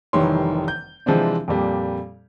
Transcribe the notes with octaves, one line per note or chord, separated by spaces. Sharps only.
F1 D#3 E3 G3 C#5 C6
G6
C3 E3 F3 G#3 C4 D4
F2 A#2 G3